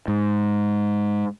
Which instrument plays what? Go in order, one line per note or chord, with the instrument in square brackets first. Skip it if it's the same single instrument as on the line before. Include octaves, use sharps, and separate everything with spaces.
[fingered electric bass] G#2